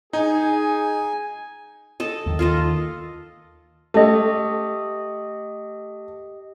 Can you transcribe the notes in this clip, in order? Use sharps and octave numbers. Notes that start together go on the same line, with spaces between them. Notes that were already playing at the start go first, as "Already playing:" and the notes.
D#4 G#4 G#5
A4 D#5
D#2 D#3
F4 A4 D#5
A3 G4 D#5